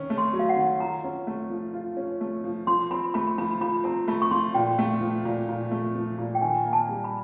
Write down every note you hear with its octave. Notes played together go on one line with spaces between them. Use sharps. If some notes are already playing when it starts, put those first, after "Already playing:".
Already playing: D#3 C#4
A3
C6
F#3
F5
F#5
D#3
F4 A#5
C#4
A3
F3
F4
C#4
A3
F3
F3 C6
C4 B5
A3 B5
F3 B5
F3 B5
C4 A#5
A3 B5
C#6
F3 C6
A#2 G5
A3
F3
A#2
A#2
A3
F3
A#2
G5
D#3 G#5
A#3
A5
G3
B5